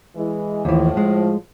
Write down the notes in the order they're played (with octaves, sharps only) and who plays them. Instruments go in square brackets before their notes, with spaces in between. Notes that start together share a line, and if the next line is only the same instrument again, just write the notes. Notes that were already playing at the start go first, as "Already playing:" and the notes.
[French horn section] E3 G#3
[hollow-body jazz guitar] D#2 E3 [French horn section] A2 F3
[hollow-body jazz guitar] G#3